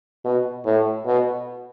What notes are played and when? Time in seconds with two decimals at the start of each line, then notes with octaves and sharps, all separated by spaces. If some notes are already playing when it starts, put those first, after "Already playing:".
0.25 B2
0.65 A2
1.06 B2